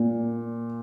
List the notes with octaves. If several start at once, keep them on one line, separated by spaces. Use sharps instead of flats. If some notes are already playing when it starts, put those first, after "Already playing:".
Already playing: A#2